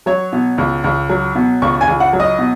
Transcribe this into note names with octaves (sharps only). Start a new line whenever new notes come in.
F#3 C#5
B2
C#2
C#2
F#3
B2
C#2 C#6
G#5
C#2
F#5
F#3
D#5
B2